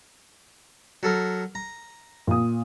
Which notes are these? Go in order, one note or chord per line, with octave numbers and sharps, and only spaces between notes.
F#3 A4 A#4
A#5
A#2 D#6